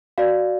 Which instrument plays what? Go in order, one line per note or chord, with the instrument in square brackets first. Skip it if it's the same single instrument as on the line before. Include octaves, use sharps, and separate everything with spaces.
[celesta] F#4 D5 F5